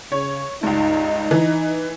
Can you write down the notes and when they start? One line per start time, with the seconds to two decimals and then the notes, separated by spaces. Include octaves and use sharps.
0.12 C#3 C#5
0.63 C#2 G2 D#4
1.31 E3